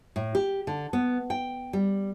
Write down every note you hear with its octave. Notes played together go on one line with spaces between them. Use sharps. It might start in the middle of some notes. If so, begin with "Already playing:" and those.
A2
G4
D3
B3
G5
G3